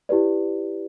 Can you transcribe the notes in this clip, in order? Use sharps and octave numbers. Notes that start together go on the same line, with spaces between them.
E4 G4 B4 D5